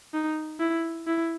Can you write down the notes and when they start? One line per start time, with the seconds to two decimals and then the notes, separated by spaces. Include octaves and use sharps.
0.14 D#4
0.60 E4
1.07 E4